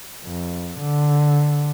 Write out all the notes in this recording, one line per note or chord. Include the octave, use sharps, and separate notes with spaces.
F2
D3